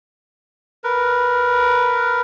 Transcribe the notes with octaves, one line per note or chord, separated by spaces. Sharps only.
A#4 B4